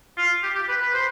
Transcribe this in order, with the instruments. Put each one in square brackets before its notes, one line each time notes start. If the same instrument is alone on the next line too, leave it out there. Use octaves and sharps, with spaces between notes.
[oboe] F4
G4
G4
B4
B4
C5